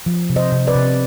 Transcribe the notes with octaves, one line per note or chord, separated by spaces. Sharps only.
F3
C3
C5 D#5
C3
B4 D5
C3